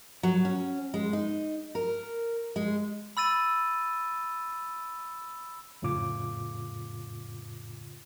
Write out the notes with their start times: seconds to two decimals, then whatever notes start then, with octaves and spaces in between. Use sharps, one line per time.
0.23 F#3
0.45 C#4
0.94 G#3
1.13 D#4
1.75 A#4
2.56 G#3
3.17 B5 E6 A6 D#7
5.82 F2 A2 C#3 F4 D6